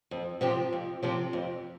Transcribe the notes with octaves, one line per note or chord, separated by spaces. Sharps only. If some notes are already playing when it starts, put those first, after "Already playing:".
F2
C3 F3 C4 G4
F2
C3 F3 C4 G4
F2